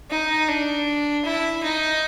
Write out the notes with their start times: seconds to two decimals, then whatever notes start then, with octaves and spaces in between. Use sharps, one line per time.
0.11 D#4
0.48 D4
1.25 E4
1.63 D#4